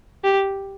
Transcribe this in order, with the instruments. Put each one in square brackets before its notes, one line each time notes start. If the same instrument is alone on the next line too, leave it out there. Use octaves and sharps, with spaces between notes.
[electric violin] G4